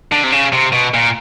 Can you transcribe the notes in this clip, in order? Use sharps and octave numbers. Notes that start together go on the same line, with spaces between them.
D3
C3
C#3
C3
B2
A#2